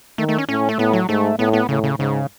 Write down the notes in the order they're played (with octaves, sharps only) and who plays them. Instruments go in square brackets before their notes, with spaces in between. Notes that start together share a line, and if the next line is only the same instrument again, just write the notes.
[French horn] D#3 [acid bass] A3
[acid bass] A3
C#4
[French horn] A2 [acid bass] C#4
[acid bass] A3
[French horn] A2 [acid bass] B3
[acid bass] F#3
[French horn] G#2 [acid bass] A3
[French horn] A2 [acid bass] B3
[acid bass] B3
[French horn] A2 [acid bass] C#3
[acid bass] C#3
[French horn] G#2 [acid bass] C#3